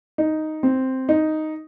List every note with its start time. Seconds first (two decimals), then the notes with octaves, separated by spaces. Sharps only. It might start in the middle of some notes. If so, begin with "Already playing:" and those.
0.18 D#4
0.63 C4
1.09 D#4